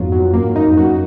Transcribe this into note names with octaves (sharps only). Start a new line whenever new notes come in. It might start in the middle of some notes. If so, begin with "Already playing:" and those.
Already playing: F2 G#2 F#3 B3 F4
F#3
F#2 A#3
G#2
F#2 D#4
F2
F#2 F#4